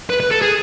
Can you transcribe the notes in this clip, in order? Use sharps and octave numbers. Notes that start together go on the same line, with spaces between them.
B4
B4
A4
G#4